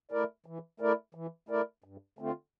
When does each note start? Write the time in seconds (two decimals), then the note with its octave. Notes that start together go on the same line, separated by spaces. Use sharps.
0.11 A3 E4 A#4 D5
0.46 E3
0.80 A3 E4 A#4 D5
1.15 E3
1.49 A3 E4 A#4 D5
1.84 G2
2.19 D3 A3 C4 F4